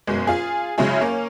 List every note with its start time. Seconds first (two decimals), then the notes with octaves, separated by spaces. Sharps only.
0.07 F#1 B2 G#3
0.27 F4 G#4
0.78 C#3 F#3 G#3 C#4 E4 G#4
1.01 A#3 C#4